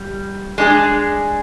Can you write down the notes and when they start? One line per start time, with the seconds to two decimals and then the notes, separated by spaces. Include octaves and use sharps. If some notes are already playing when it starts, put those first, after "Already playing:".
Already playing: G3
0.58 G#3 D4 G#4